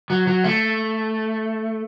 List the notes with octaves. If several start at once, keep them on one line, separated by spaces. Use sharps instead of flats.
F#3
F#3
A3